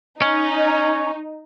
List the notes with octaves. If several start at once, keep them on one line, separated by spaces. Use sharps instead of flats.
C#4 D#4